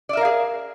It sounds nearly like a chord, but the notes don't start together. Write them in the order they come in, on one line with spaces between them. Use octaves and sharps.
D5 E5 A#4 F5 G#4